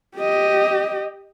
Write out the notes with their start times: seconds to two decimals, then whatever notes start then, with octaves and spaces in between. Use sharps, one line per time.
0.17 G4 D#5